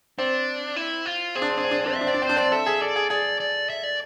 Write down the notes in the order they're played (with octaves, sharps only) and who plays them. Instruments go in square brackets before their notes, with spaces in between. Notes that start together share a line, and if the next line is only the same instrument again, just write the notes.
[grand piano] C4 [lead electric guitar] D4
[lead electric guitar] E4
F4
[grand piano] C4 [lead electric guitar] G#4
[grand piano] D4
C4
D4
C4
D4
C4
D4
[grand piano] C4 [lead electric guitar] E5
[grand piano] D4
[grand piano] C4 [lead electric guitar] D5
[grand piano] D4
[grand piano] C4 [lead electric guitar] C5
[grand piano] D4
[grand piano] C4 [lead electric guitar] D5
[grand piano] A4 [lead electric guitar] E5
[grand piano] G#4
[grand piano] A4 [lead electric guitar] D5
[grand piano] G#4
[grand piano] G#4 [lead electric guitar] D5
[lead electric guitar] D5
E5
D5